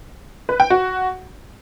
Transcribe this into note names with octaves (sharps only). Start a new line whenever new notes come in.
B4
G5
F#4